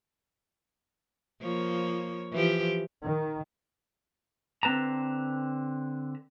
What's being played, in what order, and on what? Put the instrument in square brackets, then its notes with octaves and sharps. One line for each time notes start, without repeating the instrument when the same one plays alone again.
[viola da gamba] F3 A#3 C#5
E3 F3 G4
[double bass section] D#3
[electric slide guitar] D3 C4 B4 A5 A#5